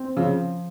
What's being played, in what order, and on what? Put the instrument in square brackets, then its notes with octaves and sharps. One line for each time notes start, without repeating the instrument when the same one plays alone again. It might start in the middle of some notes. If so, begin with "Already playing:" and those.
Already playing: [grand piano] C4
[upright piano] C#3 [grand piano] F3